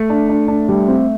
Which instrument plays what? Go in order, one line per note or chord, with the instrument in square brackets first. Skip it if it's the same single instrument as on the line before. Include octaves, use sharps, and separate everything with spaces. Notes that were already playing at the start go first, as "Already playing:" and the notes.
Already playing: [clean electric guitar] A3
[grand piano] D4
D4
D4
G3
C4